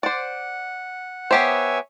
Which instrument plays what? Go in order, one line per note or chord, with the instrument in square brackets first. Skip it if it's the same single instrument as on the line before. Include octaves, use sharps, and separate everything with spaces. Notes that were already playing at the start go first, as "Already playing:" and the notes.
[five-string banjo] C5 D5 [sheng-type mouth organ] F#5
[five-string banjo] B3 G4 C5 [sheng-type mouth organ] C#5 E5 G#5